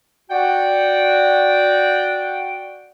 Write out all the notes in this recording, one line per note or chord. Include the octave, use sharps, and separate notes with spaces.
F#4 D5 F#5 G5